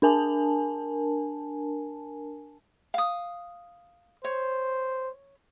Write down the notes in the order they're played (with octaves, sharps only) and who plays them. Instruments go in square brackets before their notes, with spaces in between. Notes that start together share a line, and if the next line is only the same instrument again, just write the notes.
[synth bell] D4 A#4 G#5 A5
[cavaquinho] F5 D#6
[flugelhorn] C5 [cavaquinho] C#5